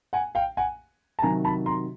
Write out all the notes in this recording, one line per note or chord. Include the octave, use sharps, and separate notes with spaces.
F#5 G#5
F5 G5
F#5 G#5
A5
C3 D#3 F#3 G#5 A#5
A5 B5
A#5 C6